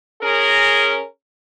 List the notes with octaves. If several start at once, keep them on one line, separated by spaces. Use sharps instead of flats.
C#4 G#4 A#4